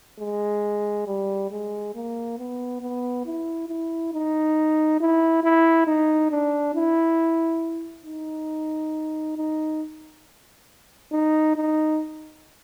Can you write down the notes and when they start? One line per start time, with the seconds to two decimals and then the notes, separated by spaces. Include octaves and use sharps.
0.19 G#3
1.07 G3
1.51 G#3
1.95 A#3
2.38 B3
2.81 B3
3.26 E4
3.69 E4
4.13 D#4
5.01 E4
5.44 E4
5.87 D#4
6.31 D4
6.75 E4
8.06 D#4
9.37 D#4
11.12 D#4
11.56 D#4